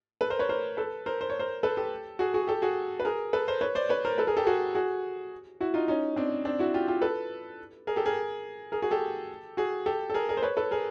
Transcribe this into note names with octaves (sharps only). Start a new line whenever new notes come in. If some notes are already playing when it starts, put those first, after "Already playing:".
A4 B4
A#4 C5
B4 C#5
A#4 C5
A4 B4
A#4 C5
C5
C#5
A#4 C5
A4 B4
G4 A4
F#4 G#4
F#4 G#4
G4 A4
F#4 G#4
B4
G#4 A#4
A4 B4
A#4 C5
B4 C#5
C5 D5
B4 C#5
A#4 C5
A4 B4
G#4 A#4
G4 A4
F#4 G#4
F#4 G#4
E4 F#4
D#4 F4
C#4 D#4
C4 D4
C4 D4
E4 F#4
F4 G4
F4 G4
A4 B4
G#4 A#4
G4 A4
G#4 A#4
G#4 A#4
F#4 G#4
G4 A4
F#4 G#4
G4 A4
A4
G#4 A#4
G#4 A#4
C5
B4 C#5
A4 B4
G#4 A#4